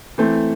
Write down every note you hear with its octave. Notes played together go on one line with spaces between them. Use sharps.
E3 A3 C4